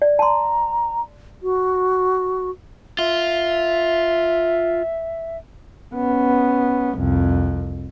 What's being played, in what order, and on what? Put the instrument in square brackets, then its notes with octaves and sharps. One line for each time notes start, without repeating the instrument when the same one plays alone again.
[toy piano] D5
[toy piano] A5 C6 [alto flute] A#5
[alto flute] F#4
[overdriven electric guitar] F4 [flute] E5
[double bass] B3 C#4
C2 F2